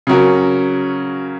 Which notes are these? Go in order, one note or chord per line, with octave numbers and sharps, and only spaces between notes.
C#3 F#3 C#4 F#4 A#4